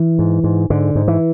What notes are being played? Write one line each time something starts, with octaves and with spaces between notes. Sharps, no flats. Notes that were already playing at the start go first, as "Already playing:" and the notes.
Already playing: E3
G#2
G#2
G#2 D3
G#2
E3